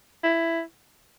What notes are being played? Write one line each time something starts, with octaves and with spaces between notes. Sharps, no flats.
E4